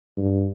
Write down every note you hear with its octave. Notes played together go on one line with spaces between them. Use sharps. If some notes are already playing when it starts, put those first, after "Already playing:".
G2